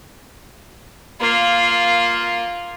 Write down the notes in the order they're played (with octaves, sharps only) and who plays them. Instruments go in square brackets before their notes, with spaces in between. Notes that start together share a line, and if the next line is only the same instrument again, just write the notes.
[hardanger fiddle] A#3 F4